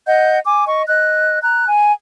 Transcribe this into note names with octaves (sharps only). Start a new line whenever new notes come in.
D#5 F#5 G6
G#5 D6
D#5 C#6
D#5 F#6
A#5 F#6
G#5